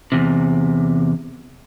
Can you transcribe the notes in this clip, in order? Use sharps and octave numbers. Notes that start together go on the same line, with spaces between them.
E2 C3